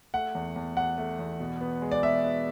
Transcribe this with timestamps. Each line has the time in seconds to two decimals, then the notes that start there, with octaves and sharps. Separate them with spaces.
0.14 A3 F#5
0.35 E2
0.56 E2
0.77 E2 F#5
0.98 A3
1.19 E2
1.40 B2
1.61 B3
1.82 G#3
1.91 D5
2.03 B2 E5
2.24 B3